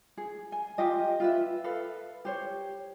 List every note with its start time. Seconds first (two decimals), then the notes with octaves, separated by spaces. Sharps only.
0.17 G#4
0.52 G#5
0.78 F4 G4 D#5
1.20 F4 B4 E5
1.64 A4 B4 F5
2.25 G4 C5 C#5